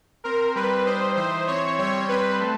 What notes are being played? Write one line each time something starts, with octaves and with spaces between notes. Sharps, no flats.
C4 A#4
G3 B4
D#4 C5
E3 C5
C4 C#5
G3 C#5
C4 B4
A3